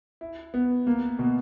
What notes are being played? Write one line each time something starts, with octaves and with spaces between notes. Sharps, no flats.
E4
B3
A#3
B2